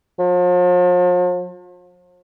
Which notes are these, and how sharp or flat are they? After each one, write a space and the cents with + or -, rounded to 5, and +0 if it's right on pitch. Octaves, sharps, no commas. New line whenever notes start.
F3 +45